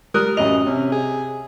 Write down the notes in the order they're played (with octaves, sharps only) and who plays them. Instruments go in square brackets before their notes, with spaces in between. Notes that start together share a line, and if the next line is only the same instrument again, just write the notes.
[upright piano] G3 D#6 F#6 [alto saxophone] A#4
[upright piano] A1 F#2 F7 [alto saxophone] D#5
[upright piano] C3 [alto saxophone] C#4
[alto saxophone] G#4